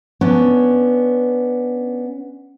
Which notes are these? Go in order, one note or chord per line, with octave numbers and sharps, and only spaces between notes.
B3 C#4 D4